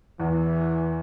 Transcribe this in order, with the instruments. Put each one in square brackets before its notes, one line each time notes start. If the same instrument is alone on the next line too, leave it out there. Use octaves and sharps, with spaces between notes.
[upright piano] E2 [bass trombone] E3